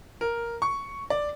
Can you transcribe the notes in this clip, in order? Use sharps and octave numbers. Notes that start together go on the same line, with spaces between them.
A#4
C#6
D5